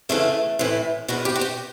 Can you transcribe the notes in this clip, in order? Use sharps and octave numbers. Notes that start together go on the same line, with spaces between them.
E2 C#3 E3 A3
A2 E3
E2 B2 F#4
G4
F#4
G4